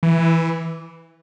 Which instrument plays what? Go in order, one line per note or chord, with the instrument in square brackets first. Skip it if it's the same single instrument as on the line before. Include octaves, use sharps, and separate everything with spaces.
[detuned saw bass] E3